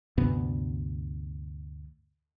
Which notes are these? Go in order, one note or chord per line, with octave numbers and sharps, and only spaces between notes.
D2 G2 C3 B3